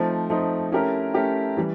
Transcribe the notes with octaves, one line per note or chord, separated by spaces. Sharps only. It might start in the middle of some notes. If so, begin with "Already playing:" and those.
Already playing: F3 A3 C4 D#4
F3 A3 C4 D#4
A3 C#4 E4 G4 A#4
A3 C#4 E4 G4 A#4
E3 G3